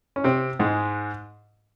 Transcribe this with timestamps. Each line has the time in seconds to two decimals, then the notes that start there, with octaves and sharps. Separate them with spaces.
0.16 C#4
0.24 C3 C4
0.59 G#2 G#3